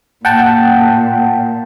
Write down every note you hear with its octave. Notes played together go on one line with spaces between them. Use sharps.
A#2 F#5 G5 A5